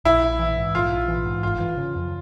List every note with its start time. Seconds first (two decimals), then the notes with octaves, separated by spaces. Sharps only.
0.05 A#1 E4
0.23 A#1
0.39 E3
0.57 G#2
0.75 A#1 F4
0.91 A#1
1.08 E3
1.26 G#2
1.43 G1 F4
1.60 E3
1.77 C#3
1.95 F2